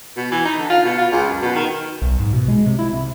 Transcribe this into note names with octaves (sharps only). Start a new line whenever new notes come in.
B2
E3
D#4
D3
F4
B2
F4
C#2
F#2
B2
D#3
B1
G#2
B2
G#3
C3
E4
C2